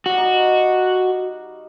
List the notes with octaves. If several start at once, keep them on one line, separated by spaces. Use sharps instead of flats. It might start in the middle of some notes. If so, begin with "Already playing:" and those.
G3 F#4 F5
D#4 D#5